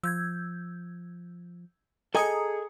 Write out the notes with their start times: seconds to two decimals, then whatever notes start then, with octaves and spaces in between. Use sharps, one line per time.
0.03 F3 E6 G6 G#6
2.15 G#4 A4 D#5 G#5 A#5 D#6 C#7